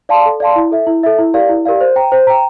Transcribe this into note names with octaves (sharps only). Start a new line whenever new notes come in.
D5 F5 A5 C6
A4
D5 F5 A5 C6
E4
A4 E5
E4
A4 E5
E4
G4 A#4 D5 F5
E4
G4 A#4 D5 F5
C5
G5 A#5
C5
G5 A#5